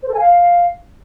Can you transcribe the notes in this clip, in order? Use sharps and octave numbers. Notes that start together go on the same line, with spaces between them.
C5
A4
G#5
F5